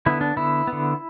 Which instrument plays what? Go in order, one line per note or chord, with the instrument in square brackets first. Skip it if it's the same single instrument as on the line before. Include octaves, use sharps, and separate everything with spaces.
[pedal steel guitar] D3 B3 E4
D4
D3 B3 E4
B3
D3